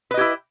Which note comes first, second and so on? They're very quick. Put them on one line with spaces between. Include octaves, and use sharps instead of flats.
B4 D#5 G4 E4